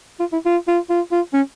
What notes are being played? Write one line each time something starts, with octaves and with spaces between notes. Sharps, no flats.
F4
E4
F4
F4
F4
F4
C#4